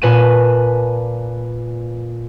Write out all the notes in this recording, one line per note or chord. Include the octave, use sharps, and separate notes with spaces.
A#2 B4 G#5 A5 D#7